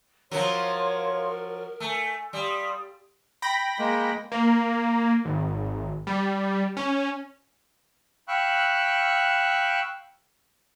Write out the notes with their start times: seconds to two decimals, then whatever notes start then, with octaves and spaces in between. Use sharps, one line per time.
0.31 F3 F#3 A#4 C#5 F5 C6
1.80 A3 G#5
2.33 G3 F5 C6 D#6
3.42 G5 B5 A#6
3.79 G#3 A#3
4.32 A#3
5.25 G#1
6.07 G3
6.77 C#4
8.28 F5 G5 B5 C#6 E6 F#6